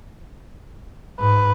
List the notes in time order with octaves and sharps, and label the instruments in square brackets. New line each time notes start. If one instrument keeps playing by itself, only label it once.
[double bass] G#2 [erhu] B4